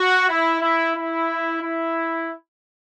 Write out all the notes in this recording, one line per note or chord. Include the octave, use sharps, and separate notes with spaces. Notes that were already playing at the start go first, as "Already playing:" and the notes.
Already playing: F#4
E4
E4
E4
E4